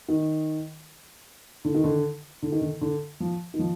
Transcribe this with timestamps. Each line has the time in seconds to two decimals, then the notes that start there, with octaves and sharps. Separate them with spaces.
0.09 D#3
1.65 D3
1.75 D#3
1.84 D3
2.42 D3
2.52 D#3
2.61 D3
2.81 D3
3.20 F3
3.54 D#3
3.59 F3